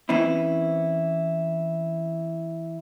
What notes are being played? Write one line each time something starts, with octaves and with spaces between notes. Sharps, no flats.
E3 C4 C#4 E4